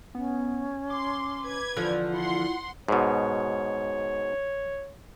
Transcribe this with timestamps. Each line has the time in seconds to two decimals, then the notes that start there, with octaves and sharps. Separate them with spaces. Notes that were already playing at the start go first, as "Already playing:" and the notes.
0.15 B3 C#4
0.90 C6 D6
1.43 B4 G#6
1.76 E2 D3 F3 F4
2.14 E4 F#5 C6
2.88 G#2 B2 C#5